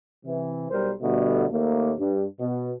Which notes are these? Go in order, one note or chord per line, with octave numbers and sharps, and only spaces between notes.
C3 E3
B1 G3 A#4 C5
B2 D3 G3 A3
D#2 A3 A#3
G2
B2